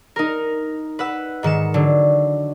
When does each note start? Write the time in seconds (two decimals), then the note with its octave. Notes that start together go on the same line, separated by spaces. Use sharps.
0.16 D#4 A#4
0.99 B4 F#5 E6
1.43 G#2 D#3 C#7 E7
1.74 D3 F#3